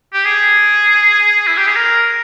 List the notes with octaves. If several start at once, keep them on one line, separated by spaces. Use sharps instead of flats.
G4
G#4
E4
G4
G#4
A#4